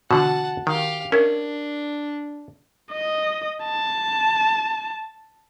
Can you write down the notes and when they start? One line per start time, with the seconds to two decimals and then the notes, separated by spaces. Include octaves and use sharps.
0.11 B2 D3 E3 F#4 F#5 A5
0.67 D#3 G4 F5
1.12 C#4 D4 E4 A#4
2.92 D#5
3.63 A5